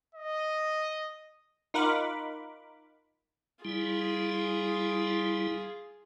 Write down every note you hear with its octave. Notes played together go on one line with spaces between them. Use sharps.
D#5
D#4 F4 A#4 F#5 B5 D6
G3 E4 F4 G#4